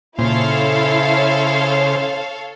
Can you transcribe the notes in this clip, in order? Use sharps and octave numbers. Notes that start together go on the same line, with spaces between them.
A#2 C#3 E4 A4 C5 C#5 F5